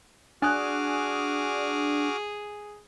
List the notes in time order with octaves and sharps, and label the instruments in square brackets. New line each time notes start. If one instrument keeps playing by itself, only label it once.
[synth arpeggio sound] D4 [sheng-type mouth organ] F#4 D6 F6 [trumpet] G#4 [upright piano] G#5 D#6 F#6